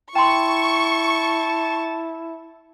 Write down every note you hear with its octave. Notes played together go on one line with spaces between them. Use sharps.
E4 G5 A5 C6 C#6